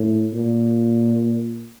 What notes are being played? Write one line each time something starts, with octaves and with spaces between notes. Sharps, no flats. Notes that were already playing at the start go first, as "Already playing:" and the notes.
Already playing: A2
A#2